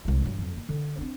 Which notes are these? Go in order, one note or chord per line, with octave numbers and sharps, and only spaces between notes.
C2 G#3
G2 F#3
F2 F#3
A#3
D3
C4 D4